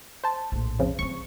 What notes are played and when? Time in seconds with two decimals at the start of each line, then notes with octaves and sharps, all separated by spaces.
0.24 C5 A5
0.52 A#1 A2
0.79 F2 C#3 F3
0.99 F3 C4 C#6